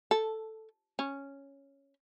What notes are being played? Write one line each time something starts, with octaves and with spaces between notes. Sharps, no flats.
A4
C#4